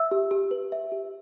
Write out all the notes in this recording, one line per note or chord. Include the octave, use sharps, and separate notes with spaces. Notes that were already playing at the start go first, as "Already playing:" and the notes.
Already playing: E5 E6
G4
G4
B4
E5
G4